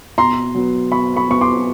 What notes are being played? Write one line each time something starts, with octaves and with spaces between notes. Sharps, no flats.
B2 A#5 C6
F#3 B3
B2 B5 C#6
B5 C#6
F#3 B3 C#6
C6 D6